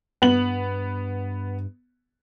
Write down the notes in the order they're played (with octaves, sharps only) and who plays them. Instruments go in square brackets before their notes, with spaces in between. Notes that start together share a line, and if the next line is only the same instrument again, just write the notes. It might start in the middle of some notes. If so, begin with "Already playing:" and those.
[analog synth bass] G2 [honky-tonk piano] B3 F#7